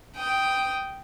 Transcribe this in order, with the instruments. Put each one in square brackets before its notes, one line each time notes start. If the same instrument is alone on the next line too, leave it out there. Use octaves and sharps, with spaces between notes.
[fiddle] G5 D#6